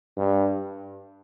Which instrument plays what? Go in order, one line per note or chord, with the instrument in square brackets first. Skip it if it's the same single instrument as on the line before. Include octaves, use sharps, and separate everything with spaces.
[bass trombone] G2